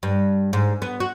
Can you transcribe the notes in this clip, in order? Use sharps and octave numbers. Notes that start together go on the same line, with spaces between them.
G2
G#2
B3
F#4